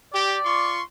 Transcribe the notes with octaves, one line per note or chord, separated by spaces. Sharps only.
G4 D5
F4 C6 C#6